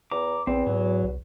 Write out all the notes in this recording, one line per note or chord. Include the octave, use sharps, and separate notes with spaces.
E2 A#5 D6
A#1 E2 C4
G#2 F#3
C2